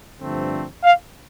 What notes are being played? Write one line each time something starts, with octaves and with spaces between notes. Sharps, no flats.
G2 D3 F3 A3 C4
F5